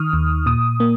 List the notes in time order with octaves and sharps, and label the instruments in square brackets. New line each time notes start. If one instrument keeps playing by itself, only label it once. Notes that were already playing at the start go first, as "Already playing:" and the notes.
Already playing: [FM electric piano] D#3 C#6 D#6 F6
D#2
A#2 D#6
A#3